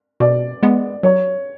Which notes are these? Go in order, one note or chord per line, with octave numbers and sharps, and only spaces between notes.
B2 D5
G#3 B3
F#3 C#5